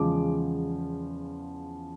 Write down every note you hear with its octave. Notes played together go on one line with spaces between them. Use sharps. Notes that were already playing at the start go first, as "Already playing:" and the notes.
Already playing: E2 C#3 F3 G#3 D6